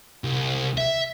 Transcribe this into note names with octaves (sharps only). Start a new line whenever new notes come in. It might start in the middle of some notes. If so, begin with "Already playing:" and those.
C2
E5